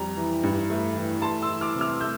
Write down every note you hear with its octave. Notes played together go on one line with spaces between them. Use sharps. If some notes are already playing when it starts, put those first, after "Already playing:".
Already playing: F2 G3 A#5
E3
G2
A3
E3
A3 A5 C6
C6 E6
E3
D6 F6
C3
D6 F6
A3 E6 G6